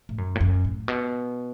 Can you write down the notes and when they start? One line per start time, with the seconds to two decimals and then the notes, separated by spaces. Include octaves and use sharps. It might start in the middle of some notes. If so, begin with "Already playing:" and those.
0.09 A2
0.18 F#2
0.35 A2
0.41 F#2
0.65 A2
0.88 B2